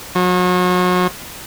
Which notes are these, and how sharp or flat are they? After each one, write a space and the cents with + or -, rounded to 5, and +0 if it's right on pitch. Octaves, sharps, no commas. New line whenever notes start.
F#3 -40